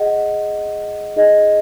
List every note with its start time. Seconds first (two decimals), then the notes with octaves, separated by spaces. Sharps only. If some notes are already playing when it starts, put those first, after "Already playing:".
Already playing: G#4 D#5 F#5
1.16 D#4 G#4 D#5